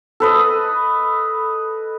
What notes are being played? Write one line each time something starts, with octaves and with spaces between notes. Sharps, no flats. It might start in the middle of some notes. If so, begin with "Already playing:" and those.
A4 B4 D#5